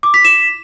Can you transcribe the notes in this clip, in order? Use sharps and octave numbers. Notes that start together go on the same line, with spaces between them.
D6
B6
E7